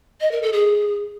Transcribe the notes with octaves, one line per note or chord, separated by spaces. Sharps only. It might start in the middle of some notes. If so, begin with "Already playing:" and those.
D#5
A#4
A4
G#4